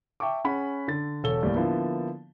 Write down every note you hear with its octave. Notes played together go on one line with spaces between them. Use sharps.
E5 G5 A5 C#6 D6
C#4 G#4 F#5 B5
D3 A6
E1 A4 C#5 G7
D#2 A2 G3 D5
D3 F3 A#3 B3 E4